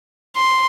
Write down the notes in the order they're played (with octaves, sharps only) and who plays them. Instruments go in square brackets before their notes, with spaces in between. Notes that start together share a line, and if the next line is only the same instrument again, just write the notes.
[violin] C6